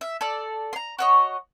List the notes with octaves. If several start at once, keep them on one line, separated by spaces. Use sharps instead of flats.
E5
A4 D5
A#5 C6
F#4 C#5 D#5